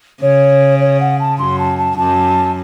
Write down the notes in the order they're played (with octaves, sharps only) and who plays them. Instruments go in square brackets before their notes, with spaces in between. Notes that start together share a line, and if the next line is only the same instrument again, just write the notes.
[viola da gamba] C#3 [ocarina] C#5
[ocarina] C#5
F#5
A5
[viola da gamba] F#2 [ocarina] C6
[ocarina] A5
A5
[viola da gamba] F#2 [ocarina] A5